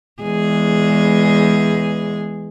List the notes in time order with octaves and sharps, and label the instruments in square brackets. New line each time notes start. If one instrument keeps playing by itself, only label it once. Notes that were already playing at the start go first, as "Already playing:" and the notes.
[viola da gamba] E2 G#3 G#4